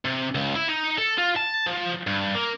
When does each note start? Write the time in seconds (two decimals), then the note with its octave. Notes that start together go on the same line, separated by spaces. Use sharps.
0.05 C3
0.35 C#2
0.56 E4
0.69 D#4
0.98 A4
1.18 F4
1.36 A5
1.66 F3
2.07 G2
2.35 A#3